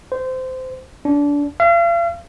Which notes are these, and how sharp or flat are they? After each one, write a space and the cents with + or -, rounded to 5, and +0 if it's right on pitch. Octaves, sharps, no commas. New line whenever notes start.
C5 -20
D4 -25
F5 -40